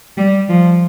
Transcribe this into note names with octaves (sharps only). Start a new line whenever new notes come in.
G3
F3